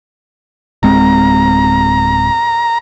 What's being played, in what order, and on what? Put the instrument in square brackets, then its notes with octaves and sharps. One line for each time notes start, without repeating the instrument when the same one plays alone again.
[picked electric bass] D1 G#3 C4 [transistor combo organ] A#5